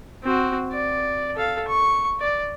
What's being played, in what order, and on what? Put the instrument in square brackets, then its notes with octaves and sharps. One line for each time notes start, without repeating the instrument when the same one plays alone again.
[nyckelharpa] C4 F#4
D5
A4 F5
C#6
D5